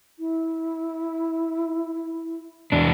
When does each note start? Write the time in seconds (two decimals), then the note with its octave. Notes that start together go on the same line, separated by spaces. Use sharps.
0.19 E4
2.72 E2 D4